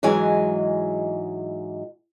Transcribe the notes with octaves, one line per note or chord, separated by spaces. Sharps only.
G#2 E3 F#3 G#3 G#5